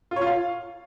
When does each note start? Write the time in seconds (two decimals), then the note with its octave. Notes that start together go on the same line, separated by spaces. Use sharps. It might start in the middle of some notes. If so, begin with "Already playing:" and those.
0.11 F4
0.16 C#5
0.21 F4
0.27 F5